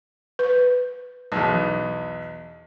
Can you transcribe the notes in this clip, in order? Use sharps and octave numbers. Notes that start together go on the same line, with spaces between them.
B4
B1 E2